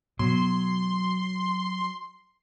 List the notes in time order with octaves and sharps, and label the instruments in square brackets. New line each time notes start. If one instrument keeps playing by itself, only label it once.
[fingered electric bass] B2 [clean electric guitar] F#3 [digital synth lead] C6